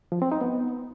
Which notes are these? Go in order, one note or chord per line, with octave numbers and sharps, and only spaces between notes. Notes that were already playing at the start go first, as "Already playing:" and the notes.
F3
C4
D#4
B3